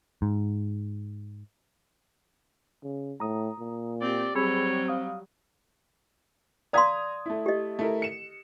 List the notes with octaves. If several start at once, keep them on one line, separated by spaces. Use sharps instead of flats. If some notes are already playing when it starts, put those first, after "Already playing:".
G#2
C#3
A2 A#5 D#6
A#2
C4 G4 D5
F#3 G3 C4 G#4 C#5 B5 E6
F5 D#6
D5 F5 A#5 C6 D#6 G#6
A3 E4
G4 D#5
A3 E4 A#4
C#7 E7